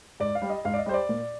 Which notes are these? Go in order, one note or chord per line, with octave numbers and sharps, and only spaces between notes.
G#2 D5
F5
G3
D#5
G#2 F5
D5
D#5
G3 C5
D5
A#2